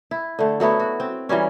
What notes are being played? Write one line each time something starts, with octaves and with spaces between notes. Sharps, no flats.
E4
D3 A3
F#3 A3 B3 E4
F#4
C4
E3 F#3 G3 C#4